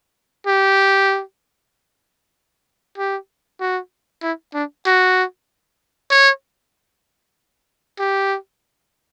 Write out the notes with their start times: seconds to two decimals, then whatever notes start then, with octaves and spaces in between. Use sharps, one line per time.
0.47 G4
2.98 G4
3.60 F#4
4.22 E4
4.54 D4
4.86 F#4
6.11 C#5
7.99 G4